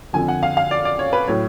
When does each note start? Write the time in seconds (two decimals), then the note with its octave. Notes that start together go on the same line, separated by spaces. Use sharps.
0.13 F2 D3 F3 G#5
0.28 F#5
0.43 F5
0.57 F5
0.71 D5
0.85 D5
0.99 C#5
1.13 B4
1.27 A2 F#3 C#5